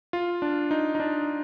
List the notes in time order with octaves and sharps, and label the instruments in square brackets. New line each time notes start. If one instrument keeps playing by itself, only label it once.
[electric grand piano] F4
D4
D#4
D#4
D4